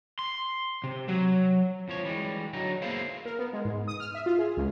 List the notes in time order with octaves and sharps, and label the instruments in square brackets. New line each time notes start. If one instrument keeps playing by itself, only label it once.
[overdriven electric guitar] C6
C3
F#3
[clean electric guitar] F2 F3 C#5
E3 G3 G#3
D3 F#3 D#4
A#3 B3 E4 G#4 C5 F5
[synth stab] A#4
B3
G#3
G#2
D#6
F6
E5
F4
G#4
C#2